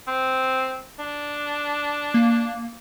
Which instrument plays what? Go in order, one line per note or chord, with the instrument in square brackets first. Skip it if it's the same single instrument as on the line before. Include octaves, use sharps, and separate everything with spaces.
[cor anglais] C4
D4
[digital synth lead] A#3